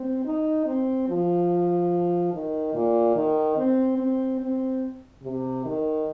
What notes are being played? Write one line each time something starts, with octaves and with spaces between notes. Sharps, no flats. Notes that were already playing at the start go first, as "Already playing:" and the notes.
Already playing: C4
D#4
C4
F3
D#3
A#2
D#3
C4
C4
C4
C3
D#3